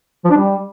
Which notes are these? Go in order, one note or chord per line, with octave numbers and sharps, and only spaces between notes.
F3
D4
G3